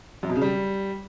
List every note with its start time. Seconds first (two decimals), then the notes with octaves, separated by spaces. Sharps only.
0.23 F#2
0.29 B2
0.35 C#3
0.41 G3